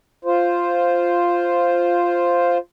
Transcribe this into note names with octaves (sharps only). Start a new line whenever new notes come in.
F4 C5